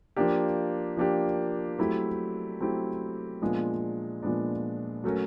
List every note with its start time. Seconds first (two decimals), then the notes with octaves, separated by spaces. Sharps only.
0.16 F3 A#3 D4 G4
0.97 F3 A#3 D4 G4
1.78 F#3 A3 C4 E4 G4
2.60 F#3 A3 C4 E4 G4
3.42 A#2 F3 G#3 B3 D4
4.23 A#2 F3 G#3 B3 D4
5.04 F#3 A3 C#4 F#4 A#4